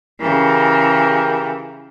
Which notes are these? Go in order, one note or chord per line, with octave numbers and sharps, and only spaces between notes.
C#3 E3 G4 A#4